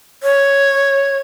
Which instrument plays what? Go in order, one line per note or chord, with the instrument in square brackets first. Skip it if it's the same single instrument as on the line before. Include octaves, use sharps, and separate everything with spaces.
[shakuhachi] C#5